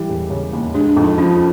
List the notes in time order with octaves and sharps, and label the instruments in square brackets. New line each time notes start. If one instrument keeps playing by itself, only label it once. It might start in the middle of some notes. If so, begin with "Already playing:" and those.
Already playing: [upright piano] E3 G3
E1
C#3
D#2
[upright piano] G#3 [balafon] D4
[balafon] D4
[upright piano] F2
[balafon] D#4
[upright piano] F3 [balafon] C#4